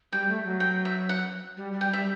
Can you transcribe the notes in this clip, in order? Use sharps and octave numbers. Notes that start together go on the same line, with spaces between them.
G3 G5
A3
F#3
G5
E5
F#5
G3
G3
G5
G3 E5